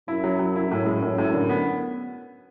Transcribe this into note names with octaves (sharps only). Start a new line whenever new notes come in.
F#2 E4
F#3
F#3
E4
F#2 A2
G#3
F#2 A2
A2
D3
B3